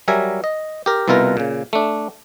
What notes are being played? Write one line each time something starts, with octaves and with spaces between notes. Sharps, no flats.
F#3 G3 A#4 E5 G#5
D#5
G4 A#4
C2 B2 E4 F4 A#4 B4
A#2 C#3
A3 D4